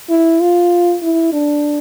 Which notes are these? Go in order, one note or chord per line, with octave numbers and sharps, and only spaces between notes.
E4
F4
E4
D4